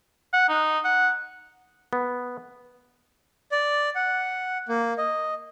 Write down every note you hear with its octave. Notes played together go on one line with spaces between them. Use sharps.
F#5
D#4
F#5
B3
D5
F#5
A#3
D#5